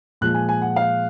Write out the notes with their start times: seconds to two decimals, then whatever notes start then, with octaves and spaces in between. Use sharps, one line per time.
0.21 A#2 F3 G#3 F#6
0.34 G#5
0.49 G#5
0.62 F#5
0.76 F5